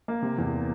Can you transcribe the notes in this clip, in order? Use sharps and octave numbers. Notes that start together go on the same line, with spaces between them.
A#3
C3
E2